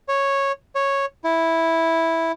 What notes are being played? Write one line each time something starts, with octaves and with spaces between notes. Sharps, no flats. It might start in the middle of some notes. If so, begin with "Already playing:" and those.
C#5
C#5
E4